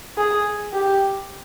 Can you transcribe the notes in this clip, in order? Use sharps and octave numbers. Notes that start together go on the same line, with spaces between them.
G#4
G4